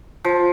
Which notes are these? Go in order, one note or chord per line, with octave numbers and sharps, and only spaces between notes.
F3